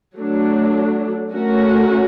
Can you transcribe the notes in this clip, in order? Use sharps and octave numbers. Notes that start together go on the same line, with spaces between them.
F#3 A3 D4
A3 C#4 F#4 A#4